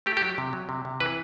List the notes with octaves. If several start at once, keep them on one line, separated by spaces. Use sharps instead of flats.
A3 G4
G4
F#3
C3
F#3
C3
C3
E3 B4